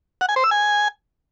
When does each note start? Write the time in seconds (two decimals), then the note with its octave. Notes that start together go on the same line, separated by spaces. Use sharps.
0.21 F#5
0.29 G#5
0.36 C5
0.44 E6
0.51 G#5